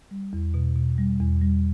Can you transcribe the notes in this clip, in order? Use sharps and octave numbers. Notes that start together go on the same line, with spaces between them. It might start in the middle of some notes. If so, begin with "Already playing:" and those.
G3
E2
B2
B2
G3
E2
G3